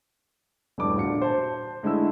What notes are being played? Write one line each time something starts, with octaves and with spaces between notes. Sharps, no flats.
E1 G2 E3 A3 D5 D6
A#2 D3 F#4 C#7
C5 A5
D3 G#3 A3 E4 E6